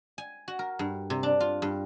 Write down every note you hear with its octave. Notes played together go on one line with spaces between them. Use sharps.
G#5
F#4
A#4
G2
C3
D4
F4
G2